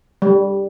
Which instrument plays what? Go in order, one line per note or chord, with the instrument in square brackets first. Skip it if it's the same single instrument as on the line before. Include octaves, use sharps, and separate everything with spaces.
[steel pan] G3